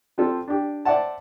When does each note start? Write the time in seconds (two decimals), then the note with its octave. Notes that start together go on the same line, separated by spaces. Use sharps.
0.18 F3 C4 F4 A4
0.48 D4 G4
0.85 C5 D5 E5 F#5 A5